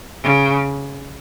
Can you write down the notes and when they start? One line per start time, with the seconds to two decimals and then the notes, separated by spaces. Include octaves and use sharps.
0.23 C#3